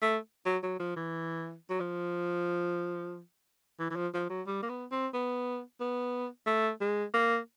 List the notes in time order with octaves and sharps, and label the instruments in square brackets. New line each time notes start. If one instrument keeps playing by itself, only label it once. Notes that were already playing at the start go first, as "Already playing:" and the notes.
[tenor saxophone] A3
F#3
F#3
F3
E3
F#3
F3
E3
E3
F3
F3
F#3
G3
A#3
B3
C4
B3
B3
A3
G#3
A#3